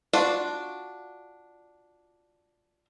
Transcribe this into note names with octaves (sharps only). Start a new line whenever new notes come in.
D4 F4 F#4 D5